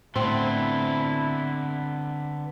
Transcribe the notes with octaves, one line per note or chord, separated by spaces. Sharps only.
A2 D3 B3 C4 E4